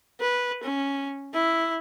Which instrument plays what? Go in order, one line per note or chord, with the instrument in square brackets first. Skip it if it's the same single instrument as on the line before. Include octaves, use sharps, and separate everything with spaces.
[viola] B4
C#4
E4